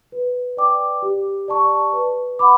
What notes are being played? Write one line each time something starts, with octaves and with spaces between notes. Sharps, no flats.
B4
D5 G5 D6
G4
D5 A5 C#6
B4
F#5 B5 D6